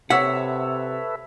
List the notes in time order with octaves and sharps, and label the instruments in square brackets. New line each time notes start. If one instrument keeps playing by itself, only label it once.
[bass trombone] C3 [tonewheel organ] A4 B4 E5 [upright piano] C#5 E6 B6 [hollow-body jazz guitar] F#5